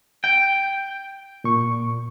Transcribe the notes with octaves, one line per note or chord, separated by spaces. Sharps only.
G5
A#2 C#6